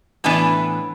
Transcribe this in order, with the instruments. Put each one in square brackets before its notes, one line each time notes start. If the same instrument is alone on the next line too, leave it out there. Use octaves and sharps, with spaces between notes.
[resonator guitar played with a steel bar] A2 E3 B3 D4 G#5